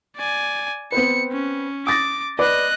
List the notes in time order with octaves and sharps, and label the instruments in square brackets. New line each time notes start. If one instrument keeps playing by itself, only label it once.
[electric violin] D5 G#5
[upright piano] B3 C4 B4 [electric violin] C#7
[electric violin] C#4
[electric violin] D6 [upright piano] D#6 A6 A#6
[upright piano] B4 D5 D6 [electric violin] D#5 F#6